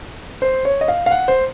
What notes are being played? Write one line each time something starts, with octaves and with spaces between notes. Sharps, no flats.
C5
C#5
D#5
F5
F5
F#5
C5